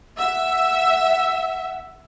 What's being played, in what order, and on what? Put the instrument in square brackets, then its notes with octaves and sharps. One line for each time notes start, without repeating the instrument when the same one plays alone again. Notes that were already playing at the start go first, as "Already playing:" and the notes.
[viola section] E5 [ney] F#5